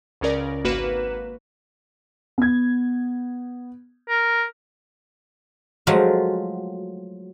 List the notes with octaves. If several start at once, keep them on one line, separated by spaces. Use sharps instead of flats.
C#2 C#3 C#4 A#4 D5 A#6
G#1 A#3 F#4 B4 F5 E7
B3 G#6
A#4
F3 F#3 G#3 A3 F4 F#4